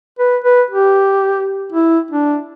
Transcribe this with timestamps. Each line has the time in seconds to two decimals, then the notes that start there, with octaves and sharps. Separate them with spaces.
0.19 B4
0.44 B4
0.70 G4
1.72 E4
2.11 D4